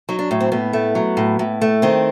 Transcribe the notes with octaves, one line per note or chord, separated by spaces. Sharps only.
F#3 D#4
D4
A2
C4
A2 B3
A3
F#3
A2
A2
A3
D#3 C4